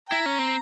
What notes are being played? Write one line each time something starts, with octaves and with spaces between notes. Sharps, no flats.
E4 G5 A#5
C#4
C4